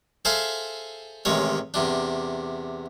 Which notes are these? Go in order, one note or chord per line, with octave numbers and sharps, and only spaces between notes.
G#4 A4 C5 E5 F5 G#5
A1 C3 D#3 G#3 C#5
E2 C3 D4